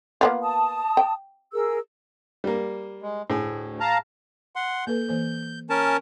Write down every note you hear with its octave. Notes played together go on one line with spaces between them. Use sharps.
A#3 B3 F4
A5 D#6
G5
G#4 A#4 E6
G3 A#3
G#3
D2 A2 G#4
F5 A5 A#5
F#5 C6
A#3 A4 B4 G6
E3 A#3 C5
C#4 A#4 A5
G#5